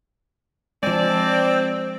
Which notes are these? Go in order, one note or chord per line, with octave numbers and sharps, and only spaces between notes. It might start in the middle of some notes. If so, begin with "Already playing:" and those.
F3 G#3 C4 D4 D5 G#5